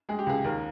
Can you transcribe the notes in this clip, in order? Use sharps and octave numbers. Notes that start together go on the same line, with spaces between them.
G#3 G#4
G4
C#2 G#4
D#2 A#4